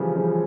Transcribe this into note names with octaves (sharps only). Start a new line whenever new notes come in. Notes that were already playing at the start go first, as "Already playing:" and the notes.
Already playing: C#3 E3 F3 G3
C#3 F3